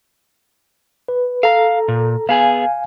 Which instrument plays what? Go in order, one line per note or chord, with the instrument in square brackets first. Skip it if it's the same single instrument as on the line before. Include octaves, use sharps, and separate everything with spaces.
[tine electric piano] B4
[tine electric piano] A4 A#5 [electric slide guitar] F5
[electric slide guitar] A#2
[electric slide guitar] B3 G#4 [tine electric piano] F5 G#5